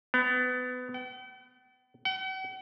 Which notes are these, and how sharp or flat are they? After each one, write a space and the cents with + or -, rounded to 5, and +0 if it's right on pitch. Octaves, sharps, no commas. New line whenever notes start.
B3 +25
G5 -45
F#5 +45